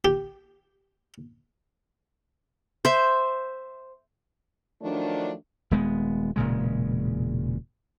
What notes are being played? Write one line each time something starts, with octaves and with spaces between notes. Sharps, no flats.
G4
C5 E5
D#3 F3 F#3 A3 D4
D#1 G#3 B3
E1 A#2 C#3 G#3